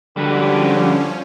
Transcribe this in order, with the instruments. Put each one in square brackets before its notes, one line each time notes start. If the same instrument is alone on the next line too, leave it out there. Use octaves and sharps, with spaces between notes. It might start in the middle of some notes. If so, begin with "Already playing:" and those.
[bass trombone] D3 [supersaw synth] F3 C#4 [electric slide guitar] G3 F#4 B4 [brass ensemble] G#3 G4